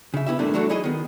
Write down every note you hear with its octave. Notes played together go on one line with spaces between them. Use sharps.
C#3 E5
B3 E4 G4 E5
G2 A#2 D#3 A3 D4 E4
E3 F#3 A3 D4 F#4 A4
D#4 E4 G#4 D#5
D#3 B3